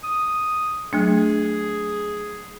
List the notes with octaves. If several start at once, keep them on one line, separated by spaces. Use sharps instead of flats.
D#6
F#3 A3 D4 G#4